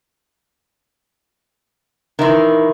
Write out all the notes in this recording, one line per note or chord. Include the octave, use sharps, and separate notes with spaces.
D#3 E3 A#4 E5 C6